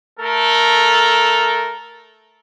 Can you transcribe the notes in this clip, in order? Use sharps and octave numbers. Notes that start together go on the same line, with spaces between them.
A3 A4 A#4